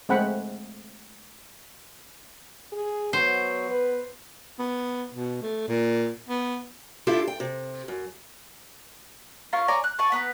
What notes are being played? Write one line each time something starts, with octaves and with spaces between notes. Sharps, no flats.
G#3 A3 C4 F#5 G5 B5
G#4
F#3 B3 C5
B4
B3
B2
A3
A#2
B3
D4 E4 F4 G4 A4
G5
C3
F#2
C#4 F4 A#4 A#5
C#5 D5 G#5 A#5
F#6
D5 G#5 A5 C#6
B3 B4 A#5